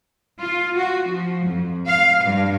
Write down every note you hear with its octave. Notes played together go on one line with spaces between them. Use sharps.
F4
F#4
F3
F2
F5
G2